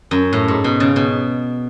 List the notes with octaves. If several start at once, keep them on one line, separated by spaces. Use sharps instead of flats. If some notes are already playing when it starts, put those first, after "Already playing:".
F#2
A2
G#2
B2
C#3
B2